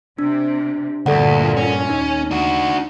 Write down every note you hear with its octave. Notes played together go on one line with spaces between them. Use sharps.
C3 D4
D2 G2 A#2 A4 D5 F#5
C#4
D#2 D#4
D4 F#4